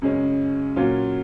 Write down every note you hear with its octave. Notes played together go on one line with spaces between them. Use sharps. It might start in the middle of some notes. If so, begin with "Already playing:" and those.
F#2 C#3 G#3 C#4
A#2 F#3 C#4 F4